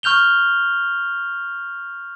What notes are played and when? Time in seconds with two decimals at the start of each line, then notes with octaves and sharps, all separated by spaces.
0.03 C#6 F6 G6 F7 G7